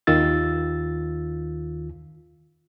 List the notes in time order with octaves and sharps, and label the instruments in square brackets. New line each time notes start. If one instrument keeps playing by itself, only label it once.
[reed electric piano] D#2 D#3 F4 E6 A6